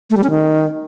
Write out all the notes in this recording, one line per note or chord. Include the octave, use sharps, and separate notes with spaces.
A3
G3
C#4
D#3